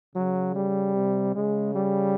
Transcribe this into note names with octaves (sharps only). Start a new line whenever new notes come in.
C#3 F#3
G3
C3
C#3 G#3
G3